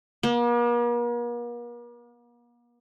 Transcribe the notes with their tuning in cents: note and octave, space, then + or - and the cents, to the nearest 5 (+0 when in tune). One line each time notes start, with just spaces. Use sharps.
A#3 +45